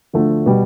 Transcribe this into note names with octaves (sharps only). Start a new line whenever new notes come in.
D2 D3 F3 A3
B2 G3